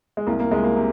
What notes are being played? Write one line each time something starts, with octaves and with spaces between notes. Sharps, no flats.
G#3
C2 A#3
A#3
C2 G#3
A#3
C3